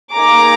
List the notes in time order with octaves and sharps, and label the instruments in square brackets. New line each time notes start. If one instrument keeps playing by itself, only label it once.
[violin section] A#3 D#4 G#4 A#5 D6